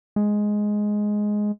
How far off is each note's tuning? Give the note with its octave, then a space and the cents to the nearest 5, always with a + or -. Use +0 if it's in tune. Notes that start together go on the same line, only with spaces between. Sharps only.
G#3 +5